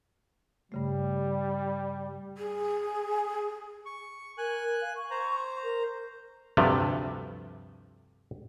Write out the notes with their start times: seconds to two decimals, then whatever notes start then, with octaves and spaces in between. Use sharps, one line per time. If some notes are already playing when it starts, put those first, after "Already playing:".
0.72 G2 C#3 G3 A3
2.37 G#4
3.86 C#6
4.38 A#4 G#5 F#6
4.81 F5
4.95 C#6
5.11 C5 A#5
5.63 A#4
6.57 D2 G2 C3 F3 A3